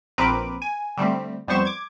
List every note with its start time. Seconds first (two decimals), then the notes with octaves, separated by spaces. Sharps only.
0.18 A#1 C4 A#4 B4 D6 D7
0.62 G#5
0.97 D3 G3 A3 C4
1.48 F2 G3 B3 C5 C#6 E7
1.65 D6 G#6